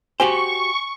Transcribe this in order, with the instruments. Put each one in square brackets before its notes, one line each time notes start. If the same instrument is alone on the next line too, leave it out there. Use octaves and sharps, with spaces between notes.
[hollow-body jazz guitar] F#4 G4 C5 [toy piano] G#5 [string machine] C#6